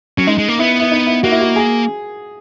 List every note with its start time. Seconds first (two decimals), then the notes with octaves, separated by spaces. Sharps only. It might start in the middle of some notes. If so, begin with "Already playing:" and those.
0.17 F#3 C#4
0.27 G#3 D#4
0.38 G#3
0.48 A#3
0.59 B3 E4
0.80 E4
0.91 D#4
1.07 E4
1.23 A#3 F#4
1.31 E4
1.41 F#4
1.56 G#4